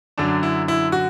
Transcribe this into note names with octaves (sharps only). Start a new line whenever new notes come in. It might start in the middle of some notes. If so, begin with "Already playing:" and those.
F#2 D3 F#3 D4
E4
E4
F#4